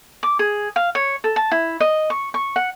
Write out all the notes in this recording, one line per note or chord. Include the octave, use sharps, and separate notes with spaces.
D6
G#4
F5
C#5
A4
A5
E4
D#5
C#6
C#6
F#5